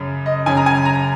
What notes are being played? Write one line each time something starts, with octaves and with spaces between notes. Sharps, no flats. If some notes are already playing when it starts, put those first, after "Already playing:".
Already playing: F#2 C#3
D#5
F#2 C#3 G#5
A#5
G#5
A#5